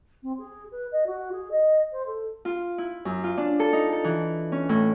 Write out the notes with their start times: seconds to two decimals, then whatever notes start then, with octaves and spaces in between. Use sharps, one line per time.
0.22 C4
0.38 G#4
0.71 B4
0.91 D#5
1.06 F#4
1.31 G#4
1.51 D#5
1.91 C5
2.06 A4
2.45 F4
2.78 E4
3.05 F#2
3.24 F4
3.38 D4
3.60 A4
3.73 D#4
3.92 A4
4.04 E3
4.52 C#4
4.69 A2